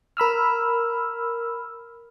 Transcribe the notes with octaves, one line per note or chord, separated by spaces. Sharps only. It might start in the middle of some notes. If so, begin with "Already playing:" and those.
A#4 B5 E6 F6